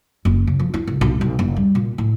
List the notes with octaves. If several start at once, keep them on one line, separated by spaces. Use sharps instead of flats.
F#1
C#3
F3
E4
C#2
B1
B1
F#1
G3
A#2
A2